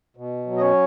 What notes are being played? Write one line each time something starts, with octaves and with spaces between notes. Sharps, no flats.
B2
F#3
D#5
C#4 C#5